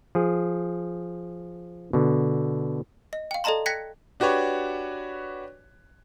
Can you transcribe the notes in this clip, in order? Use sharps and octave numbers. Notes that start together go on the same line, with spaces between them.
F3 G#4
B2 D3
D#5
F5 G5
A4 D5 D#5 A5 A#5 C6
G5 F#6 G#6 A#6 B6 C#7
D4 F#4 G4 B4 C#5